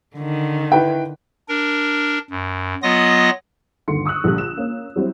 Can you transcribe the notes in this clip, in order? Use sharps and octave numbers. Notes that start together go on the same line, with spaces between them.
D3 D#3
E4 B4 G5
D4 A#4
F#2
F#3 B3 F4 D#5 D#6 A#6
G1 D#2 D3 C6 C#7
C#6 D#6 E6 F#6
A#1 D3 G3 F#6
E7
A#3 C#4
F#3 G3 C4 E4